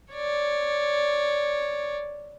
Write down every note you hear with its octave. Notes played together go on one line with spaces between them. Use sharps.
C#5 D5